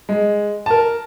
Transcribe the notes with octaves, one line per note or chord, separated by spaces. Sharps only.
G#3
A#4 A5